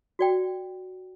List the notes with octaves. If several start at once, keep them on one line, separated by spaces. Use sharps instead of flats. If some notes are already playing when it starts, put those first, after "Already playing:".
F#4 D5 G5